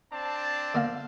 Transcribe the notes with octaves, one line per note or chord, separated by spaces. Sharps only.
C4 D4 A5
D3 A#3 F5